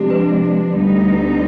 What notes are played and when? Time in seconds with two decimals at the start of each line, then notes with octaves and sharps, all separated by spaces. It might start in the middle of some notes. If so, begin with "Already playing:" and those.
Already playing: C3 F3 G#3 D4 G4
0.10 B4
0.74 D2 D3 G3 B3 D#4